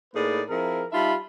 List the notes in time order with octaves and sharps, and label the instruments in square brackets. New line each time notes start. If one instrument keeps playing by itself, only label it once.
[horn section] A2 A#3 D#4 G#4 B4 D5
F3 C4 E4 G#4 A#4
G3 D#4 F4 E5 A5 B5